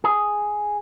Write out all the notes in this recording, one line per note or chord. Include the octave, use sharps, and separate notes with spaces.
G#4